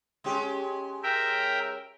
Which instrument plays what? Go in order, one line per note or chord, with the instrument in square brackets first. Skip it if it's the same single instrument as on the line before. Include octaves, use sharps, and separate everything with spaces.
[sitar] G#3 C#4 G4
[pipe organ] A#4 E5 G5